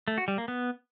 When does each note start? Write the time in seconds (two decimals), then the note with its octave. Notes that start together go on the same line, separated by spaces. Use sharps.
0.08 A3
0.18 F#4
0.28 G3
0.38 A#3
0.48 B3